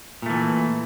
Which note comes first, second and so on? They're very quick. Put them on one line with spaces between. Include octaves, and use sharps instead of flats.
A#2 A3 E3